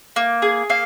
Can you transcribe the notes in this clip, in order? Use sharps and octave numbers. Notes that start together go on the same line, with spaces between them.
A#3
G#4
A#3 F5